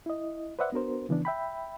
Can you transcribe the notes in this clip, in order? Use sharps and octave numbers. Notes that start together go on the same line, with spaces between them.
E4 D#5
B4 C5 D5 E5 F#5
B3 D4 F#4 A#4 C5
C#3 E3 B3 D4
E5 G5 B5